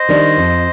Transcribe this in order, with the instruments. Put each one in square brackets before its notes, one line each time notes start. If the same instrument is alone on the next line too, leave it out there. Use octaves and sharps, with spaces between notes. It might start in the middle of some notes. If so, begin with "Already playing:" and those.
Already playing: [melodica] C5 D#5
[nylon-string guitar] D#3 G3 D4
F2